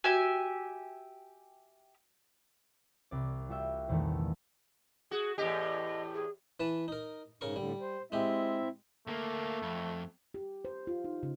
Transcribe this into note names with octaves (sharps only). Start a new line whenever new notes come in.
F#4 G4 E5 G#5
C2 D5
G3 F4 F#4 E5 G5
A#1 E2 D#3 G3 A3
F#4 G#4
E2 A2 G4 D#5
G#4
E3 B4 A5
D#4 A#4
G#2 C#3 A#4 C#6
A2 D3 G3
C5
G#3 C4 E4 G4 E5
D2 A3 A#3
F2
G4
C5
F4
D#4
C#3